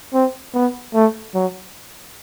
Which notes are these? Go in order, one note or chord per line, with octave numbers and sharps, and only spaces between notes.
C4
B3
A3
F#3